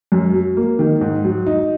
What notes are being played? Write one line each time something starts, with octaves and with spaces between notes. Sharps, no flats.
F#2
F#3
A#3
D#3
G#2
F#3
D#4